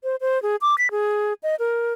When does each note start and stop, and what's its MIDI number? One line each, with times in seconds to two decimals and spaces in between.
0.04 0.16 72
0.21 0.41 72
0.43 0.56 68
0.62 0.75 86
0.78 0.91 95
0.91 1.33 68
1.43 1.55 75
1.59 1.93 70